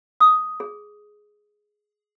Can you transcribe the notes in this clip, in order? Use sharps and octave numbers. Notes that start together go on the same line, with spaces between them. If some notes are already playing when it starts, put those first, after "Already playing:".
D#6
G#4